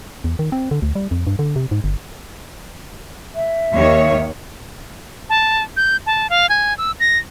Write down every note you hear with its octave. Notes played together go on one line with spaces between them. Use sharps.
E2
D#3
C4
D3
D2
G3
F2
G2
D3
C3
G#2
G1
E5
D#2 D#3 C#5
A5
G6
A5
F5
G#5
E6
A#6